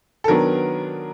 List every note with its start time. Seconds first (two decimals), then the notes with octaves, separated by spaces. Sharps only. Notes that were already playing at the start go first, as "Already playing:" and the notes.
0.24 A4
0.28 D#3 F#3 B3 D4 A#4